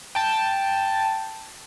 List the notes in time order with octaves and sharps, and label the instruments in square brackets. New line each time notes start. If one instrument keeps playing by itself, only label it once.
[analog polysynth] G5 A5